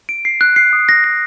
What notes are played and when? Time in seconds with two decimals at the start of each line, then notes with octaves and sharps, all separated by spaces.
0.09 D7
0.25 C7
0.41 F#6
0.56 C7
0.73 D#6
0.89 A#6
1.04 A#6